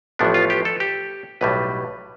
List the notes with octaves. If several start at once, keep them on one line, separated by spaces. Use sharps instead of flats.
A1 A2 F3 B3 D4
F4
G4
A4
G4
B1 A2 G3 B4